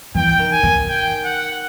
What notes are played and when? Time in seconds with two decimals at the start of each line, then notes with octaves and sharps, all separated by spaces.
0.15 E3 G5
0.39 D#3
0.52 G#5
0.63 D#3
0.88 G5
1.24 F#5